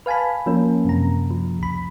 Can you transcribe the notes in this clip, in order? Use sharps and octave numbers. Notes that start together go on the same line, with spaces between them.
B4 F5 G#5 A5 B5
F3 A#3 C#4 A#4
F#2 C3 A#5
F3
C#2 B5